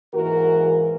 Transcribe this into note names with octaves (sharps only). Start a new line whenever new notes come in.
G#2 E3 A#3 F#4 A#4